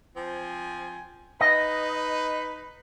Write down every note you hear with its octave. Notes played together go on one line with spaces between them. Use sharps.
F3 C4 G#5
D#4 B4 D#5